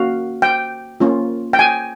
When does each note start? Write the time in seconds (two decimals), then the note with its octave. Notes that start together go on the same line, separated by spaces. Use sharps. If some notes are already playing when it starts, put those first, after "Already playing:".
Already playing: A#3 C#4 F#4 F5
0.42 G5
1.00 A#3 C#4 F4
1.53 G5
1.59 G#5